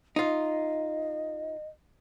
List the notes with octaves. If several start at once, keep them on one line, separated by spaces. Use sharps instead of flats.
D#4 F4 D#5